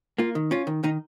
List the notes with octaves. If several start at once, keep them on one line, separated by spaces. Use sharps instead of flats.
A#3 F4
D#3
C#4 F4
D#3
D#3 D#4